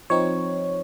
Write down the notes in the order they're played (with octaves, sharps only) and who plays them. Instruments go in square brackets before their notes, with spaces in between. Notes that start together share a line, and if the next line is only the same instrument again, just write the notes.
[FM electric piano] F3 C4 D#4 C#5